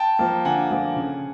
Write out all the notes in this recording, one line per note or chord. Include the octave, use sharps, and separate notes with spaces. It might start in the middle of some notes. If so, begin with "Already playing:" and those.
Already playing: G5 A5
F3 A#3
D3 F#5 G#5
F3 A#3
C#3